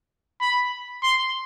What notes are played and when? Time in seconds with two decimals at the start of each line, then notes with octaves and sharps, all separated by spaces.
0.41 B5
1.03 C6